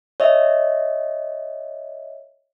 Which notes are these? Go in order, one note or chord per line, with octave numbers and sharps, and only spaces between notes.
C#5 D#5 E5